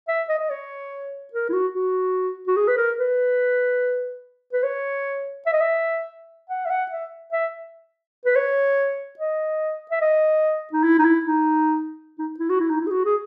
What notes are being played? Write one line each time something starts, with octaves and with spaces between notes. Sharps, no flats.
E5
D#5
D#5
C#5
A#4
E4
F#4
F#4
F#4
G#4
B4
A#4
B4
B4
C#5
E5
D#5
E5
F#5
E5
F#5
E5
E5
B4
C#5
D#5
E5
D#5
D#4
E4
D#4
E4
D#4
D#4
E4
F#4
E4
D#4
E4
G#4
F#4
G#4